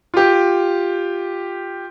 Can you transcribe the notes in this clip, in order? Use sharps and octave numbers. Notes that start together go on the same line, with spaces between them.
F4 G4